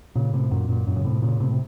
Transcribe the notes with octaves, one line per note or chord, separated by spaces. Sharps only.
A#2 C#3
A2 C3
F#2 A#2
F#2 A#2
F#2 A#2
C#3
A2 C3
A#2 C#3
A2 C3
C3